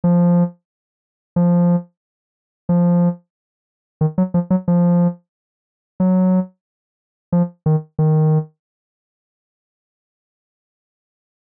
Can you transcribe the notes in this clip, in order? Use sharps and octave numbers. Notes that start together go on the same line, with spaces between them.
F3
F3
F3
D#3
F#3
F3
F#3
F3
F#3
F3
D#3
D#3